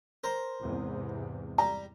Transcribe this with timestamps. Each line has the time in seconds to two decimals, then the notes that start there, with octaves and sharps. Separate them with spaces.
0.24 A#4 C5
0.62 E2 G#2 C3
1.58 G3 A#5